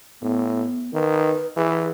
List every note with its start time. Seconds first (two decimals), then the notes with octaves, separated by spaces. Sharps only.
0.22 A2 B3
0.94 D#3 B4
1.56 E3 G#4